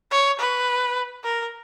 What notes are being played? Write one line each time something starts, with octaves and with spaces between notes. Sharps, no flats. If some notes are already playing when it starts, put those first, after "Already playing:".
C#5
B4
A#4